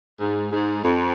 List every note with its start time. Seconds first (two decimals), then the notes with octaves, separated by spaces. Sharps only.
0.20 G#2
0.51 G#2
0.83 F2